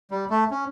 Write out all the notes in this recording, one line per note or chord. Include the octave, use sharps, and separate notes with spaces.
G3
A3
C#4